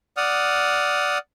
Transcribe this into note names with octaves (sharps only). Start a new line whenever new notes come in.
D5 F#5 D#6 F6